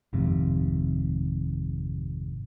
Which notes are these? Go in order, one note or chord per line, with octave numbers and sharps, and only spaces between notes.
G#1 F2 G#2 C3